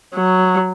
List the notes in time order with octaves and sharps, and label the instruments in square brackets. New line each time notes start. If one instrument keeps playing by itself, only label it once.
[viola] F#3